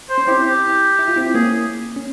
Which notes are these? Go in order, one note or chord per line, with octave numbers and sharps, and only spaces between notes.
C5
C#4
C4 E4 G4
G4
E4
F4
C4 E4
A#3 C#4 G#4
C#4